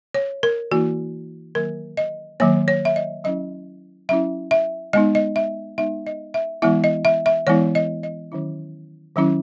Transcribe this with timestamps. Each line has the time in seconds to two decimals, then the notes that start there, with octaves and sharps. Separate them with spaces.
0.15 C#5
0.43 A#4
0.71 E3 A#3 E4 F#4
1.55 D#3 F#3 A#3 A#4
1.97 D#5
2.40 D#3 F#3 A#3 C#5
2.68 C#5
2.85 E5
2.96 D#5
3.24 F#3 C#4 E4 D#5
4.09 F#3 C#4 E4 E5
4.51 E5
4.93 G#3 B3 D#4 D#5
5.15 D#5
5.36 E5
5.78 G#3 B3 D#4 E5
6.07 D#5
6.34 E5
6.62 E3 G#3 B3 E4 E5
6.84 D#5
7.05 E5
7.26 E5
7.47 E3 G#3 B3 E4 C#5
7.75 D#5
8.03 D#5
8.32 D#3 F#3 C#4 E4
9.16 D#3 F#3 C#4 E4